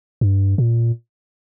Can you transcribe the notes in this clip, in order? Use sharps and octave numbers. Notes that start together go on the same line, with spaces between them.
G2
A#2